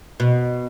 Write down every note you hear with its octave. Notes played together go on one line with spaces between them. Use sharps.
B2